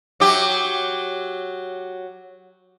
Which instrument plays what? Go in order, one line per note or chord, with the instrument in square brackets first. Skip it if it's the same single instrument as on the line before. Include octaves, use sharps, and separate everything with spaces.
[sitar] F#3 G4